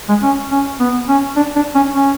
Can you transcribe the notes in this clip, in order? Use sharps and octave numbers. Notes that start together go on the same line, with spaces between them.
G#3
C#4
C#4
B3
C#4
D4
D4
C#4
C#4